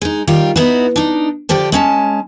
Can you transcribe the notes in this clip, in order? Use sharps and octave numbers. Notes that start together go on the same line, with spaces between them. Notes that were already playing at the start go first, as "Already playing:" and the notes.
G#3 D#4
D#3 G3 F4 G4
B3 D#4 E4 F#4
D4 D#4
D3 F3 G4 D5 G5
G#3 C#4 A5